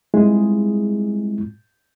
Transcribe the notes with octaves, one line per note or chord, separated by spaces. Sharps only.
G3 G#3 C4 E4 F4 G#4